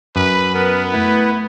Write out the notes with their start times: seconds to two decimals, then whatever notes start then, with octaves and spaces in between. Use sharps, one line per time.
0.16 F#2 B4
0.54 B3 A#4 B4
0.92 A3 E4 B4